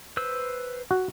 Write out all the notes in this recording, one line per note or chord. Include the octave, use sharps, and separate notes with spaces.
B4 C5 E6
F#4